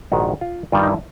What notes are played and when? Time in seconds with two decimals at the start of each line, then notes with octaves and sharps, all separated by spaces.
0.12 A#1 G#2 D#3 F#4
0.41 F4
0.72 G2 D#3 G3 F4
0.83 D#4
0.87 E4